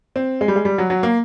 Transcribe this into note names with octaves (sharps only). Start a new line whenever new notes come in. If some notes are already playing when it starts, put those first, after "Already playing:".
C4
G#3
G3
G#3
G3
F#3
F#3
A#3